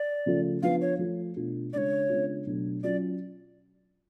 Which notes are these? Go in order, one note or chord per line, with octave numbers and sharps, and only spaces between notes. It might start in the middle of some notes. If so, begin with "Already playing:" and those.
Already playing: D5
C#3 F3 A3 F4
F3 B3 D4 F4 F5
C#5
F3 A3 F4
B2 A3 D4 F4
C#3 G#3 D4 C#5 D5
C#3 G#3 B3 D4 F4
B2 F#3 A3 D4
F#3 C#4 F4 D5